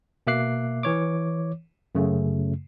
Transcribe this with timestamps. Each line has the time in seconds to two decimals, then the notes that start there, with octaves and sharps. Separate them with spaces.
0.27 B2 A#3 E5 D6 F#6 C7
0.83 E3 C#5 D6
1.95 F#2 C#3 A3